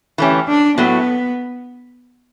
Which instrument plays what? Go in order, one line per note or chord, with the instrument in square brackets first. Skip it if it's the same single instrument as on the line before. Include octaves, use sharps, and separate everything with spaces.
[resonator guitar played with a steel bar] E3 A3 C#4 G4
[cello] D4
[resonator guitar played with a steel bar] A2 F#3 A3 [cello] B3